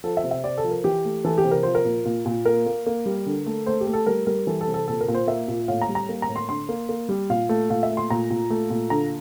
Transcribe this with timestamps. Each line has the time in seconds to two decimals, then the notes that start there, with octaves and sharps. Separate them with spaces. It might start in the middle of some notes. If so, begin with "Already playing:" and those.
0.04 F3 A4
0.17 E5
0.24 C3
0.31 E5
0.44 C3 D5
0.58 A4
0.64 F3
0.71 A#4
0.84 E3 G4
1.05 A3
1.24 E3 A4
1.38 G4
1.44 C3
1.51 A#4
1.63 F3 C5
1.75 A#4
1.85 A#2
2.05 A#2
2.26 A#2
2.45 A#3 A#4
2.66 A#3
2.86 A#3
3.06 G3
3.26 D3
3.46 A3
3.66 A3 C5
3.81 G4
3.87 A3
3.93 A4
4.06 G3 A#4
4.27 G3 A#4
4.47 E3 A4
4.61 A4
4.67 C3
4.74 A4
4.88 A#2 A4
5.01 A#4
5.08 A#2
5.15 C5
5.27 A#3 E5
5.48 A#2
5.68 A2 F5
5.82 A#5
5.89 G3
5.95 A#5
6.09 A#3
6.22 A#5
6.28 A2
6.36 C6
6.49 D3 C6
6.69 A#3
6.89 A#3
7.09 G3
7.30 A#2 F5
7.49 A3
7.70 A#2 F5
7.83 E5
7.90 A3
7.97 C6
8.10 A#2 A#5
8.30 A#2
8.50 A3
8.70 A#2
8.90 D3 A#5